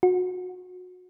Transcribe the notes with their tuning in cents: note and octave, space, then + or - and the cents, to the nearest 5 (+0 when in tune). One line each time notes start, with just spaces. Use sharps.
F#4 -30